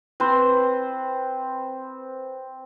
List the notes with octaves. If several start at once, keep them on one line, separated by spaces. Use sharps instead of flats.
C4 B4 C5